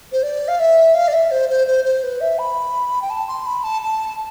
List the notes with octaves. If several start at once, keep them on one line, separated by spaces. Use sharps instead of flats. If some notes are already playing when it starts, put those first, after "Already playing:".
C5
D5
F5
E5
F5
D5
E5
C5
C5
C5
C5
B4
E5
B5
G5
A5
C6
B5
A5
A5